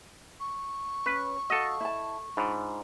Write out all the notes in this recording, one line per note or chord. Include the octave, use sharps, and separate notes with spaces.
C#6
C#4 B4
F#4 A4 D#5 F5
E4 A5
G#2 D4 F4 B5